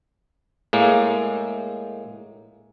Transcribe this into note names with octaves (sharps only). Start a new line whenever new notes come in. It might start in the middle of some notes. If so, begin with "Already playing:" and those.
A2 G#3 A#3